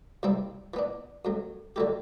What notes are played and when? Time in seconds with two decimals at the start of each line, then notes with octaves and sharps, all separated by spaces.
0.23 C2 C3 G3 C4 E4
0.74 E3 B3 D4
1.25 F#2 F#3 A3
1.76 D3 F#3 A3 E4 G4